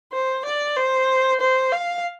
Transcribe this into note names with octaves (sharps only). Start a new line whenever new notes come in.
C5
D5
C5
C5
F5